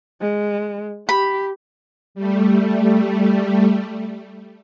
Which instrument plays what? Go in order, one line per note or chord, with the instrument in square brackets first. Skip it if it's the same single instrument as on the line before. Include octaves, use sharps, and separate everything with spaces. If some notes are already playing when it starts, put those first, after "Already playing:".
[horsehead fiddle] G#3
[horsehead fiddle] G4 [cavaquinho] B5
[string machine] G3 A3